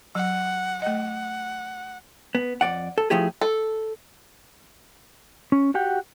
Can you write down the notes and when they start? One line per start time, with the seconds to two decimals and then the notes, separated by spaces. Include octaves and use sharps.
0.15 F#3 F#5
0.82 A3 D#5 F#5
2.35 B3
2.61 F2 D5 F#5
2.98 A4
3.10 F3 A3 E4 G4 G#4
3.41 A4
5.52 C#4
5.74 F#4 G4 F#5 G5